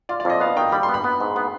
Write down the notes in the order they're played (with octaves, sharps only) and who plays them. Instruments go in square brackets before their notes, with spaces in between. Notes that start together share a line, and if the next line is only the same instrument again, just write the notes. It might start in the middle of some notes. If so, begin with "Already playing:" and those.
[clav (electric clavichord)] F4 [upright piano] D5
[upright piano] D5
[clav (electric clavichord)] F2 [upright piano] D#5
[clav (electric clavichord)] B3 [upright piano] F5
[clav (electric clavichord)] D#3 [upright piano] G5
[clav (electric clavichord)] G3 [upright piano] B5
[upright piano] C6
[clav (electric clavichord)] B3
[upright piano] B5
[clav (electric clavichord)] B3
G#2
B3